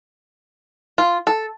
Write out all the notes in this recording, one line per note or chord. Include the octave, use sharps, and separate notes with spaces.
F4
A4